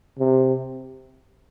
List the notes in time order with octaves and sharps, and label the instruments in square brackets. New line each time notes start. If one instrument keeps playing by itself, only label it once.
[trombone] C3